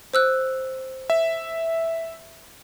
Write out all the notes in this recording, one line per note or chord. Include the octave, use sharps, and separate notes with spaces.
C5 E6 F#6
E5